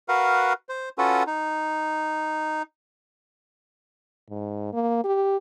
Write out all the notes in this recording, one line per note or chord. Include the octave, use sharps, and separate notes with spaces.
F#4 A#4 B4 F5 F#5
C5
C#4 F4 F#4 A4 B4 F#5
D#4
G#2
A#3
G4